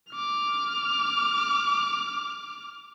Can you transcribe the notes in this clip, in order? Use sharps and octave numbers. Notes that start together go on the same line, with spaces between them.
D6 F6